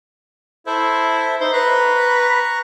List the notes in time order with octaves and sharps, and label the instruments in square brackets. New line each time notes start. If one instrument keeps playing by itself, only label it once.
[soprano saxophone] E4 [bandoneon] A4 C5 E5
[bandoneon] D#4 E5 [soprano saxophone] C5
[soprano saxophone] B4 [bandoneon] A#5 C#6 F#6